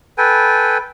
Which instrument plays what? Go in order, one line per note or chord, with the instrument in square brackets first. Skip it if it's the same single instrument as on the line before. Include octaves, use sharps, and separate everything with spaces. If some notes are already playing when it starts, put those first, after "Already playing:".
[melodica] A4 B4 G5 G#5